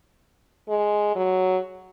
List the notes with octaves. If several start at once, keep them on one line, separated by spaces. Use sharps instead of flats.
G#3
F#3